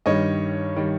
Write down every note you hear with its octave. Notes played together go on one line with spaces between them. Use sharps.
G2 D#3 G3 C#5 D#5
D#3 G3